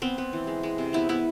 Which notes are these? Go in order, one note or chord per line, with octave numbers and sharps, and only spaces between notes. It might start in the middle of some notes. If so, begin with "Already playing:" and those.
B3 C4
B3
E3
G#3
G#3
C3
B3 E4
B3 E4